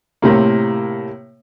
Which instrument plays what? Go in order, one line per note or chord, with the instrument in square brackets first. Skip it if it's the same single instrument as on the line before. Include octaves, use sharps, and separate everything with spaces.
[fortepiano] A2 C3 A#3